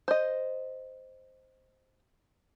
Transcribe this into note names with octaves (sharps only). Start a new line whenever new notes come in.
C5 D#5